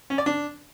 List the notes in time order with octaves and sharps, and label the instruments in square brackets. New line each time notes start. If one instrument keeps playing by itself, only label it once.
[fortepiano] C#4
D5
D4